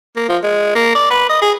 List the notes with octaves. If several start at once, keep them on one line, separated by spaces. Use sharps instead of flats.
A#3
F3
G#3
A#3
D5
B4
D#5
G#4